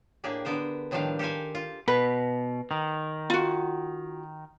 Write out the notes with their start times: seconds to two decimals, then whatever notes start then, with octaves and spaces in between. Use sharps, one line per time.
0.24 A2 A#3 D4 G4 G#4
0.45 D3 B3 A#4 C5
0.91 A2 D#3 F3 G3 D4 F5
1.19 G4 A4 A#4 C5 F5 G#5
1.55 F4
1.88 B2 B4
2.71 D#3
3.30 F4 F#4